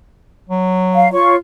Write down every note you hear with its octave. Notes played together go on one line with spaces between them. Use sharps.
F#3
F5
F4 C#5 C#6